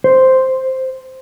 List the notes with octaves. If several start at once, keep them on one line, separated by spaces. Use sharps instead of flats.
C5